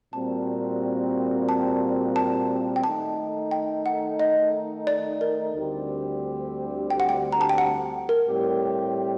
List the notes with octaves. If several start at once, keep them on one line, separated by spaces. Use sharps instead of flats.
A#2 G3 C4 F#4 A#4 A5
A5
A5
G5
D#3 A3 D#4 A4 A5
G5
F#5
D#5
D5
A#4
D2 D3 G3 C4 G4
G5
F#5
G5
A#5
A5
G5
F#5
A#4
A2 G3 C4 G4